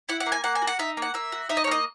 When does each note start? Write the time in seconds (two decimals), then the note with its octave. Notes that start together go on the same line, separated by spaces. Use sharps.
0.09 E4 F#5
0.20 F#5
0.26 A#3
0.32 G#5
0.44 A#3 F#5
0.55 G#5
0.62 F#4
0.67 F#5
0.79 D#4 E5
0.97 A#3 F#5
1.14 A#3 E5
1.32 F#4
1.49 D#4 E5
1.57 D#5
1.64 C#5
1.67 A#3 D#5